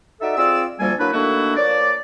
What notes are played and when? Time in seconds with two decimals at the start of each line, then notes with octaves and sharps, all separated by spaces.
0.21 D#4 F#4 A4 D5 E5
0.37 C4 F4 G#4 D5 E6
0.80 D2 F3 G3 A#3 A4 G#5
0.99 F#3 A#3 D4 E4 B4
1.13 D#3 A3 A#3 D4 E4 F#4
1.57 F3 A#3 C#5 D5